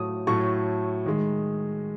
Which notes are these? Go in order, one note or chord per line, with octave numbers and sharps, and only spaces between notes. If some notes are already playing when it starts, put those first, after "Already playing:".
Already playing: A2 F#3 A3 D#6
A2 F#3 A3 C#6
D#3 G#3